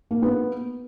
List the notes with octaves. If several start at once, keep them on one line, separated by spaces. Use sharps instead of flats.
A#3
B3